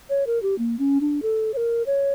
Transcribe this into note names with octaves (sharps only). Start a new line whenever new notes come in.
C#5
A#4
G4
A#3
C#4
D4
A4
C#5
A#4
C#5